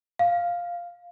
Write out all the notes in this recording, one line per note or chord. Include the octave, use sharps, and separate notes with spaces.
F5